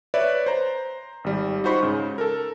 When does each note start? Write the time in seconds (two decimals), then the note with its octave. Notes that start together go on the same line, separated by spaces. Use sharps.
0.14 B4 C#5 D5 E5
0.46 C5 A#5
1.24 G#1 G3
1.64 D#4 F4 F#4 C5 B5 C#6
1.83 G#2 C#3
2.18 A4 A#4